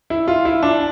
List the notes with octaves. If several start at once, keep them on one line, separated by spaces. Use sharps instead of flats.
E4
F4
E4
D4